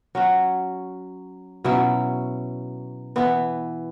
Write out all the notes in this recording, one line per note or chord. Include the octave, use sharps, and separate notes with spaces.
F#3 C#4 F#4
B2 F#3 C#4 E4
E3 B3 E4